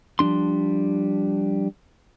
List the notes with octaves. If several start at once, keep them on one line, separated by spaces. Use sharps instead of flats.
F3 G3 D4 C6